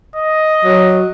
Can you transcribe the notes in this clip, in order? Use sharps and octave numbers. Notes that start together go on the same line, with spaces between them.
D#5
F#3